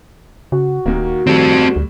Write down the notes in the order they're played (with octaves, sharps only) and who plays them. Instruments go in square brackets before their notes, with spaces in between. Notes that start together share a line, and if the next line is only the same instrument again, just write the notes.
[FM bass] C#3 [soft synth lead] F#4
[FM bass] D1 [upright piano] D#2 A#3
[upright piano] A2 G3 [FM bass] D#3 [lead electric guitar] C4 A4
[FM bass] D2